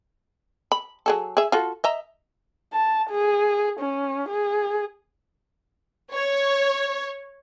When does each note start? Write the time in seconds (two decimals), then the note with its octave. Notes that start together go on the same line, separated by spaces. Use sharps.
0.72 B5
1.06 F#3 G#4 A4
1.37 G#4 E5
1.52 F4 F#4 A4
1.84 D#5 E5 A#5
2.73 A5
3.10 G#4
3.80 C#4
4.29 G#4
6.12 C#5